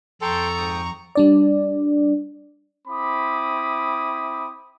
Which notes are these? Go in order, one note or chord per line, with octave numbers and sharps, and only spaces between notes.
F2 A4 G5 A5 A#5 C6 C#6
G#2 G5 D#6
G3 D4 D5
C4 E4 B5 D6 D#6